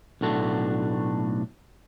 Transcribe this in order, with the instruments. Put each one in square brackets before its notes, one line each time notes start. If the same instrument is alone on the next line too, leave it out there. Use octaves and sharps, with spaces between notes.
[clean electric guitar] B1 A2 A3 D4 F#4